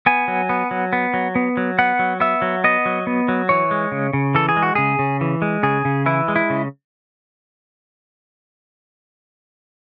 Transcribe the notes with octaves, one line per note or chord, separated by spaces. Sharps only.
B3 G#5
F#3
B3
F#3
B3
F#3
B3
F#3
B3 F#5
F#3
B3 E5
F#3
B3 D#5
F#3
B3
F#3
E3 C#5
G#3
C#3
C#3
E3 A4
G#4
G#3
F#4
C#3 G#4
C#3
E3
G#3
C#3 G#4
C#3
E3 E4
G#3
E4
C#3